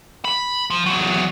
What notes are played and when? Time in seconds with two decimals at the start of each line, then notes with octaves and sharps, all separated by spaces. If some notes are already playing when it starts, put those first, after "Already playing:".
0.25 B5
0.70 F3
0.86 E2 F#3